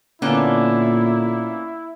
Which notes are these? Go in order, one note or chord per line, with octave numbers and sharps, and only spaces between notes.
A#2 D3 A#3 B3 C#4 E4